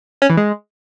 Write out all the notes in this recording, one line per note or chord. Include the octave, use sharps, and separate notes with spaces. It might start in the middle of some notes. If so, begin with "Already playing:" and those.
C#4
E3
G#3